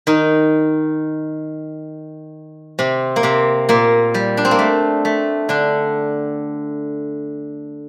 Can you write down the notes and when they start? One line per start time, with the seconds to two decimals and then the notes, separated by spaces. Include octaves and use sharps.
0.07 D#3 D#4
2.79 C3 C4
3.16 A#3
3.23 C3 C4
3.69 A#2 A#3
4.14 G3
4.37 D4
4.45 C4
4.51 A#3
4.59 A3
5.05 A3
5.49 D3 D4